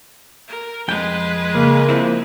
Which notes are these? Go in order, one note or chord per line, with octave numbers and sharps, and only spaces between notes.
A#4
F2 G#3 B4 G5
C#3 A#3
F3 C4 E4